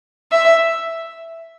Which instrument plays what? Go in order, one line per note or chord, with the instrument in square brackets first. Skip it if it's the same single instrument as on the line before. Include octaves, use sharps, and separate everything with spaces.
[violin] E5